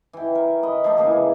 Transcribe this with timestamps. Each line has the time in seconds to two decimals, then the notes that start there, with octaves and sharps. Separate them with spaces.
0.13 E3 G5
0.35 A#4
0.63 D#5 B5
0.84 F3 A3 A#3
0.97 C#3 E3 A#3 G#4